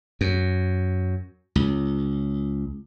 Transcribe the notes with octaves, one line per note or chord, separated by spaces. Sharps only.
F#2
C#2